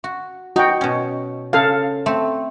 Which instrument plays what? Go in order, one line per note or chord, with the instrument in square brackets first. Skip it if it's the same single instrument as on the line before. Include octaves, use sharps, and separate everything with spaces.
[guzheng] F#4
[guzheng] D#4 [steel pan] F#4 G5
[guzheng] B2 C#4
[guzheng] C#3 [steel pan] A4 F5
[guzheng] A3 C4